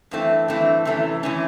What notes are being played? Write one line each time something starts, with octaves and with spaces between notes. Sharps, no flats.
G2 E3 A3 C4
G2 E3 A3 C4
C3 E3 A3 C#4
C3 E3 A3 C#4